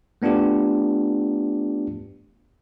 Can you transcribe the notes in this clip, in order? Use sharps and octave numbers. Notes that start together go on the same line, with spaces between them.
A3 B3 D4 F4 G4